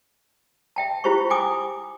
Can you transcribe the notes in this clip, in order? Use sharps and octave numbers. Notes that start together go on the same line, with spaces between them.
E5 G5 A5
E4 F4 G4 C5 E5 C#6
G5 G#5 D6 D#6